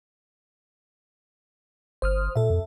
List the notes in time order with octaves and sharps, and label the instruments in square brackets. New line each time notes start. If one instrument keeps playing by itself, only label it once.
[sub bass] G1 [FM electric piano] C5 D#6 F6
[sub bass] A#2 [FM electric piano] A4 E5
[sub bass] F2